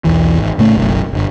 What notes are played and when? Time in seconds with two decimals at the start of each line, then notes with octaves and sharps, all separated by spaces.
0.05 B1 E2 E3
0.37 G#1
0.58 A2 C#3 A3
0.76 F#1 B1 F#2
1.13 D1 G1